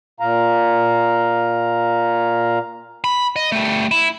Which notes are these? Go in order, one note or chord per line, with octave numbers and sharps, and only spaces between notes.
A#2 F5 A#5
B5
D#5
G3 A3
E4